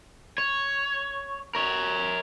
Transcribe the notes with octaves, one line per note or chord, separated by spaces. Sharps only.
C#5
A#4 C#5